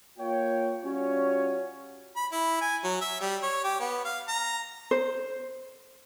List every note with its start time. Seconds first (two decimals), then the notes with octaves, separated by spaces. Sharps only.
0.18 A#3 F4 C#5 G5
0.83 G3 C#4 F4 F#4 C#5
2.16 B5
2.32 E4
2.61 G#5
2.84 F#3
3.01 E5
3.20 G3
3.43 C#5
3.64 G4
3.80 B3
4.05 F5
4.28 A#5
4.91 C5